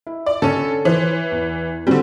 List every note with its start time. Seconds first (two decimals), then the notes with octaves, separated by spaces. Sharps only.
0.07 E4
0.26 D5
0.42 D3 C#4 A4
0.85 E3 C5 C#5
1.32 E2
1.87 D3 F#3 G3 C4 F#4